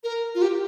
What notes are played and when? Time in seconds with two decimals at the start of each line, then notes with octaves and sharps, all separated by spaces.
0.04 A#4
0.35 F4
0.42 G4